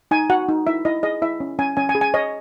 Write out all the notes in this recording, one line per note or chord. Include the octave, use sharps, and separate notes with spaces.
D#4 G#5
F#4 F#5
D#4
E4 E5
E4 D#5
G#4 D#5
E4 E5
C#4
C#4 G#5
C#4 G#5
G#5
G#4
G#5
C#5 D#5